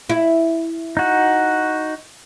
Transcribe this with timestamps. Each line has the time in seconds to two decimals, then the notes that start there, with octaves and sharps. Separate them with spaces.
0.09 E4
0.97 D#4 F#4